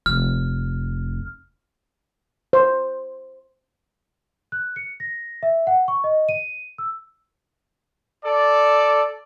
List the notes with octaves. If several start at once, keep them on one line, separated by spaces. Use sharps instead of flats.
F1 F6
C5
F#6
C#7
A#6
E5
F#5
C#6
D#5
D#7
E6
A4 D5